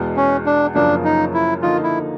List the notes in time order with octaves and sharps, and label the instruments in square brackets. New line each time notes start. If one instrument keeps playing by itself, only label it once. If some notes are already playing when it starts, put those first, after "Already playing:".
Already playing: [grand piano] E2 B2 G#3
[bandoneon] C#4
D4
[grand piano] F#2 C#3 F3 A#3 [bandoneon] D4
[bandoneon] D#4
E4
[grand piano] D3 F3 A#3 D#4 [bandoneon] F4
[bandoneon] E4